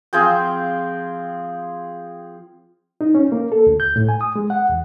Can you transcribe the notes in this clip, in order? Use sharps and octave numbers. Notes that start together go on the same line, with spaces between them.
F3 C4 G#4 G5
D#4
C#4
A#3
A4
D2
G6
A2
G#5
D#6
G#3
F#5
E2